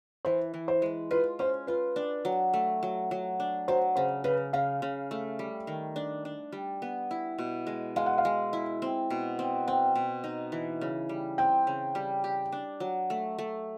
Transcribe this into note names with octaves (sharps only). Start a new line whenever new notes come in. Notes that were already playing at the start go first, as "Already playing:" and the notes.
E3 C5
E3
C5
G#3
F4 B4
C#4 C5
F4 B4
D4
F#3
A3
F#3
F#3
D4
F#3 C5
C#3 C5
C#3 B4
C#3 F5
C#3
A3
G3
D#3
D4
D4
G3
B3
E4
B2
G#3
G#3 F5
F#5
F5
G#3
E4
C4
B2
C4
C4 F#5
B2
D#4
E3
C#3
G3
C4 G5
C#3
G3
G4
D4
F#3
A3
A3